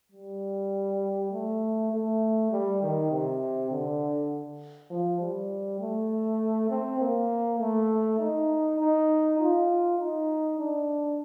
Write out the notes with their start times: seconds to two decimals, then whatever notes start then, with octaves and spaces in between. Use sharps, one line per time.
0.12 G3
1.32 A3
1.91 A3
2.51 G3
2.82 D#3
3.11 C3
3.71 D3
4.90 F3
5.20 G3
5.80 A3
6.70 C4
7.00 A#3
7.59 A3
8.19 D#4
8.79 D#4
9.39 F4
9.99 D#4
10.58 D4